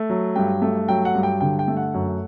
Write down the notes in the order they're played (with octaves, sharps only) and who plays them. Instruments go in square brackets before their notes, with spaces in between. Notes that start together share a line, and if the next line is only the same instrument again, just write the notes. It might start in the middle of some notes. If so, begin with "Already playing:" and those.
Already playing: [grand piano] A3
F#3
G2 G5
A3
F#3 G5
F#5
G2
G5
D3 G5
G5
A3
F#5
F#2